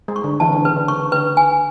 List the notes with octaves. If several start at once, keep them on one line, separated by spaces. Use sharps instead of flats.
G#3
C#6
D3
E3 A5
C#3
D3
C#3 B4
D3
C#3 C#6
D3 B4
G#5